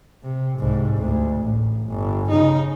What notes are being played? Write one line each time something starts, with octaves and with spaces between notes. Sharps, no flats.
C3
C2 G#2
D2
A1
G1
C#3 D#4